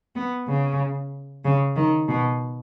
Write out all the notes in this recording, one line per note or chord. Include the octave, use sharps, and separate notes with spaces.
B3
C#3
C#3
D#3
B2